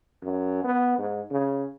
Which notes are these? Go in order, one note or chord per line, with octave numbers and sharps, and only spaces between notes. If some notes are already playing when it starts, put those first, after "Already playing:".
F#2
B3
G#2
C#3